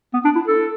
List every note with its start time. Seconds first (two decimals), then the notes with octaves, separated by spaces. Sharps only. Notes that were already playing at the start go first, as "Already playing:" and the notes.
0.14 B3
0.25 D4
0.36 E4
0.47 A4